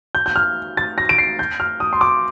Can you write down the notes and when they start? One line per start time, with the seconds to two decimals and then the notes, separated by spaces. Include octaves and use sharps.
0.15 G6
0.26 G6
0.36 F6
0.77 A6
0.98 A#6
1.09 D7
1.18 C7
1.39 G6
1.60 F6
1.80 D#6
1.93 C6
2.01 D6